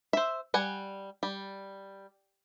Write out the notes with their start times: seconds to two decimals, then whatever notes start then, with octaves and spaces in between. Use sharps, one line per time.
0.13 C5 E5
0.54 G3 F#5 G#5
1.23 G3